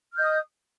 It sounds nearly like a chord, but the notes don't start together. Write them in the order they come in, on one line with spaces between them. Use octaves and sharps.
F6 G6 D#5 D#6